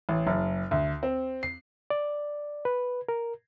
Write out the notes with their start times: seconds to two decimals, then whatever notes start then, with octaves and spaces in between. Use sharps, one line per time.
0.09 A1
0.27 F#1
0.71 D2
1.03 C4
1.43 C7
1.90 D5
2.65 B4
3.09 A#4